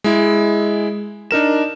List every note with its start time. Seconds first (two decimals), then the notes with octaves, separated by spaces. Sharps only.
0.04 G#3 E4
1.31 D4 D#4 A#4 E7